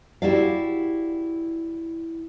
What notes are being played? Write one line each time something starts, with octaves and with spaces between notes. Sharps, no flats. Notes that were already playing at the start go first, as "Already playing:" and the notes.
E4 F#4 G4 D5 F5